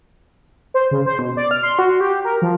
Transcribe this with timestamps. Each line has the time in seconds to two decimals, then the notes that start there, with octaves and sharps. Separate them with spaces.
0.74 C5
0.91 C#3
1.06 C5
1.19 B2
1.37 D5
1.51 F6
1.63 C6
1.79 F#4
2.01 G4
2.25 A#4
2.42 F3